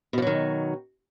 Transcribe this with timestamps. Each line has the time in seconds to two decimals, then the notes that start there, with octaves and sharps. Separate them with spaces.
0.13 B2
0.18 F3
0.22 F#3
0.27 D#3